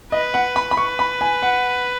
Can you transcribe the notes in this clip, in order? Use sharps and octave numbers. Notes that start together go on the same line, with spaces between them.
B4 D#5
F#5
B5
B5
B4 C#6
B5
G#5
F#5